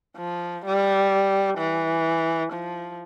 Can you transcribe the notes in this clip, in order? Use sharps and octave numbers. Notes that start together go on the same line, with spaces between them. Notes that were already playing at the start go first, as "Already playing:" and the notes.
F3
G3
E3
F3